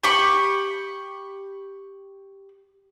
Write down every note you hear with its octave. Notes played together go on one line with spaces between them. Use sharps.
G4 B5 C#6